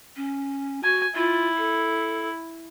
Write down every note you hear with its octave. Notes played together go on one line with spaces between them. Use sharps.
C#4
F#4 G#5
E4 F4
A4